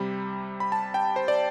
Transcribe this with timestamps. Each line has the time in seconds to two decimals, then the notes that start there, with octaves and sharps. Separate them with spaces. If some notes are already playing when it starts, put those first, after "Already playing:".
Already playing: C3 G3 B5
0.60 B5
0.72 A5
0.94 G5
1.16 C5
1.28 D5